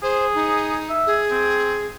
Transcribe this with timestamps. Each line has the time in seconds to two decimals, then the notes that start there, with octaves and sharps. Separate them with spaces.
0.03 G#4 C5
0.35 D#4
0.90 E5
1.07 G#4
1.31 C4